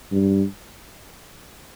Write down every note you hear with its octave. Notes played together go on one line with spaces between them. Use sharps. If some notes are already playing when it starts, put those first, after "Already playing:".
G2